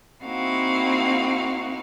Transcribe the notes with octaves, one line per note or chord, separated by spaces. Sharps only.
A#3 C4 D#4 E4 F#4 F5